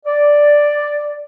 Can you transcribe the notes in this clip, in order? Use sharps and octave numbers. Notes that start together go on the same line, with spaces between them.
D5